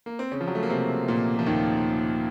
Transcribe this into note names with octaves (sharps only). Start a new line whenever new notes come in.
A#3
C4
C#3 C#4
F3
F#3
A3
A#3
C3 C4
A#2 A#3
F3
D#2 D#3